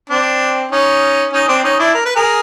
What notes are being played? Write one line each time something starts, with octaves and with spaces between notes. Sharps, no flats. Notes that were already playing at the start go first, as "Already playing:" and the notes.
C4 D4
C#4 D#4
C#4 D#4
C4 D4
C#4 D#4
D4 E4
A#4
B4
G#4 A#4